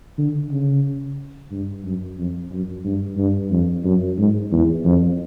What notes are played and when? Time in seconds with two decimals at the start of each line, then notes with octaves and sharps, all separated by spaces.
0.18 D3
0.51 C#3
1.51 G2
1.85 F#2
2.18 F2
2.52 F#2
2.84 G2
3.18 G2
3.51 F2
3.85 F#2
4.18 G#2
4.51 E2
4.85 F2